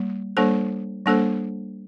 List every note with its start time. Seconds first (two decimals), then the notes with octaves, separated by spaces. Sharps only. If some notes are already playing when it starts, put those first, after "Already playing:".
Already playing: G3 A#3
0.37 G3 A#3 D4 A4 C5
1.06 G3 A#3 D4 A4 C5